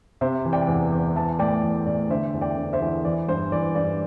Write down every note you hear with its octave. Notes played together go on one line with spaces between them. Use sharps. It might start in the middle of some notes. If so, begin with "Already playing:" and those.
C3 C5 E5
E3
D5 G5
E2
E2
E3 E5 A5
A2 D5 G5
E3
A2 D5
D3 C5 E5
E2
D5 G5
D3
C5 E5
E2
E3 D5
G2 C5
E3 D5
G2 D5